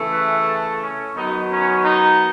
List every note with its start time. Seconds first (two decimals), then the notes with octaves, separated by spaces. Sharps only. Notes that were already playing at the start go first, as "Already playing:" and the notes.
Already playing: C#3 E3 A3
0.12 B4
0.47 A4
0.81 C#4
1.16 D#3 F#3 B3 D#4
1.51 C#4
1.85 D#4